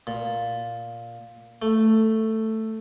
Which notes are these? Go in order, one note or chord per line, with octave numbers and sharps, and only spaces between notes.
A#2
A3